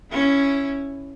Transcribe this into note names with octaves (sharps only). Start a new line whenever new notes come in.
C#4 E4